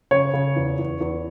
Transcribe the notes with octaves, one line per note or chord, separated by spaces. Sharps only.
C#3 C#5
C#3
E2
E2
E2